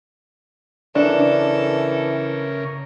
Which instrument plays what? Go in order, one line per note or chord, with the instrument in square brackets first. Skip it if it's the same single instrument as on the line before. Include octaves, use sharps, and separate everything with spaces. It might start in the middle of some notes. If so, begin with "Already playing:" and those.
[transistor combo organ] C#3 C#4 A#4 [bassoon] E3 [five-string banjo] D4 [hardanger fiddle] A4